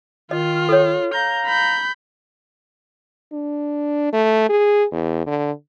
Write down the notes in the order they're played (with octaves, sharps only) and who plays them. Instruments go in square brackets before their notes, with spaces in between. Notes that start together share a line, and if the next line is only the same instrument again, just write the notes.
[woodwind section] D#3 [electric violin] F4 [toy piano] D#5
[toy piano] A4 C#5
[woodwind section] F5 A#5 [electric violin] G6
[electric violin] B5 G6
[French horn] D4
A3
G#4
E2
D3